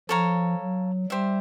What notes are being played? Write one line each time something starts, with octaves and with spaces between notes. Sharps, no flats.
F3 A4 C#5 F5 A#5
F#3
G3 G4 C5 E5